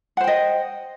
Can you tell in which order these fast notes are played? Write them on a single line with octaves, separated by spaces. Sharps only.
F#5 C5 G5 D#5